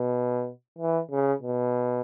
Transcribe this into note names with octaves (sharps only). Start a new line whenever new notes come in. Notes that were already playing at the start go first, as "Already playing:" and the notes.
Already playing: B2
E3
C#3
B2